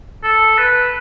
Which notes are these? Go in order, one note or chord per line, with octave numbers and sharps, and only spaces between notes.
A4
B4